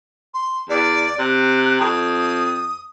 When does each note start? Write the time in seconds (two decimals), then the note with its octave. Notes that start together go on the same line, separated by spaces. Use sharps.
0.34 C6
0.69 E2 D5
1.19 C3 F#6
1.80 F2 D#6